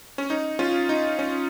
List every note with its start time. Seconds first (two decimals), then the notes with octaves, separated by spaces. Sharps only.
0.18 C#4
0.30 D#4
0.59 C#4 F4
0.89 D#4
1.19 C#4